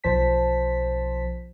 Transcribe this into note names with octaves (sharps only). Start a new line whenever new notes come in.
B1 F3 C5 A5 B6